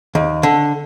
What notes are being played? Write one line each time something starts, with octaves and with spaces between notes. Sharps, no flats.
D#2
D3